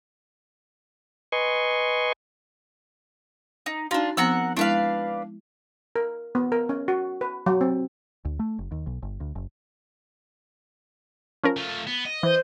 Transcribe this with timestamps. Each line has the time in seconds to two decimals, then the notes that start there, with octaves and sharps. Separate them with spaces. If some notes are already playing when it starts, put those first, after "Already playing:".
1.32 B4 D#5 G#5 C6 C#6
3.66 D#4
3.91 D4 D#4 F4 F#4
4.17 F3 B3 C4 A#4 F#5 E6
4.57 G#3 D4 E4 B4 F5
5.96 A#4
6.35 B3
6.52 A#4
6.69 C#4
6.88 F#4
7.21 B4
7.46 F#3
7.61 C4
8.25 D2
8.39 A3
8.59 F#1
8.71 D#2
8.87 B1
9.02 G1
9.20 D2
9.35 F#1
11.43 F3 C#4 A#4
11.56 A3 F4
11.87 B3
12.06 D#5
12.23 E3 C5